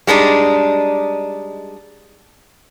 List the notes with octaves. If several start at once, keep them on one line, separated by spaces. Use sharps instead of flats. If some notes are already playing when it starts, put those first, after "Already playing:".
G3 G#3 D4 D#4